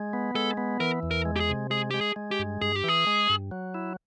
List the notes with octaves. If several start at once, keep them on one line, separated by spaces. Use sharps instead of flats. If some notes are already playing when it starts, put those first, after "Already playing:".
Already playing: G#3
B3
G#3 A4
B3
E3 A#4
E2
A#4
G#3
G4
G#4
C3
G#3 G#4
G#3 G4
G#4
G#3
G4
G2
G2 G#4
G4
E3 G#4
G#3
G2
F#3
E4